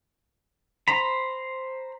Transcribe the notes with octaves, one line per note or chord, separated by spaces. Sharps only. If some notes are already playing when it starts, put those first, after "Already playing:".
C5 A#5 B5